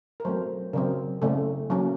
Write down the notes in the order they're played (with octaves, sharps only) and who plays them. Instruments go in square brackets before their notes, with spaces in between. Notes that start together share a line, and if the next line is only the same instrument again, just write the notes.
[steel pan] A#4
F#3 A3 C4 C5
C#3 F#3 C4 A#4
C#3 A3 C4 A4
F#3 A#3 C#4